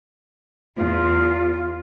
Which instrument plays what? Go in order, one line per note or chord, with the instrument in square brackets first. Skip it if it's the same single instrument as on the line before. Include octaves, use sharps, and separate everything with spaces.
[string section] E2 [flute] F4